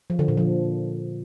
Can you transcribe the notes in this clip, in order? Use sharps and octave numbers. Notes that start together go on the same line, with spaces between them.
F3
D3
A#2
F3